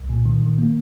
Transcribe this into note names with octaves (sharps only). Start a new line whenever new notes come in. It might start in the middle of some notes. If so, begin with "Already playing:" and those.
Already playing: C2
A#2
D#3
D#3
A#3